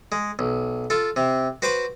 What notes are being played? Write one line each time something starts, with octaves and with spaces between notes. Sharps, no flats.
G#3
B1
F4 A4
C3
F#4 B4 C5 C6 D6